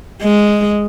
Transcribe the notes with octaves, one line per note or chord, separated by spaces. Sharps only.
G#3